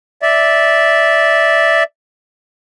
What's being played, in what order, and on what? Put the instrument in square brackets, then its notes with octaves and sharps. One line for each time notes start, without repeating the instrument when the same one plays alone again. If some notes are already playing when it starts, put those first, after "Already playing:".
[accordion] D5 E5